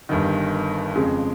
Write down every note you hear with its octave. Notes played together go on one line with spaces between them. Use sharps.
G1 G2 D#3
F2 C#3 G#3